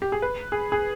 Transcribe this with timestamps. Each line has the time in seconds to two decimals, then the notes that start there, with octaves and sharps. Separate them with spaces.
0.02 G4
0.12 G#4
0.22 B4
0.52 G#4
0.72 G#4